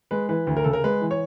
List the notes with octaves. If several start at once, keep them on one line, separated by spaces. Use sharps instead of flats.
G#3 B4
E3 B4
D2
A#4
C#3 A4
A#4
G#3 B4
E3
C#5